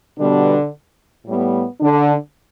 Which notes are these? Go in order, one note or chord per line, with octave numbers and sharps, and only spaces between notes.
B2 D3 G3 B3 D4
A2 G3 B3
D3 D4